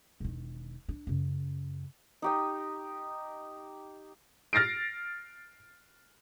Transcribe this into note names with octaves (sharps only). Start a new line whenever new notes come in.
E1 D#3
D4
F#2 C#3
D#4 G4 D#5
F6 A6 A#6 C7 D7